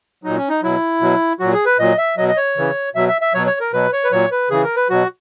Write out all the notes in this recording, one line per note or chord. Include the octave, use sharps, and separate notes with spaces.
A#2 F#3 D#4
C#4
D#4
B2 F#3 E4
B2 F#3
A#2 F#3 F#4
G#4
B4
A#2 F#3 D#5
E5
B2 F#3 D#5
D#5
C#5
C#3 E3
B2 F#3 E5
E5
E5
B2 F#3 C#5
C#5
A#4
B2 F#3 B4
C#5
B4
A#2 F#3 C#5
B4
C#3 E3 G#4
A#4
B4
B2 F#3 F#4